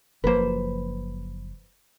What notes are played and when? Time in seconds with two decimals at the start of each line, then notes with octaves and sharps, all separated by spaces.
0.24 F#1 F3 A#3 B4 C5